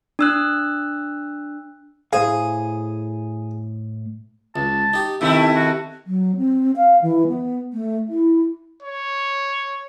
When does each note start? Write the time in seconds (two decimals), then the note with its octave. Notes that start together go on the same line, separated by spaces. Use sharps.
0.19 D4 E6 F#6
2.13 A2 G#4 C5 F5
4.56 C#2 A5
4.93 D#4 G4
5.21 C3 D#3 A3 C#4 E4 E5
5.56 F#4
6.07 F#3
6.37 C4
6.76 F5
7.02 E3
7.28 B3
7.73 A3
8.09 E4
8.82 C#5